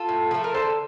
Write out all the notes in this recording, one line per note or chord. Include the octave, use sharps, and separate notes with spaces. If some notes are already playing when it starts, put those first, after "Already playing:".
Already playing: F4 A4
A2
F3 A3 A4
A#4
D3 A4 C5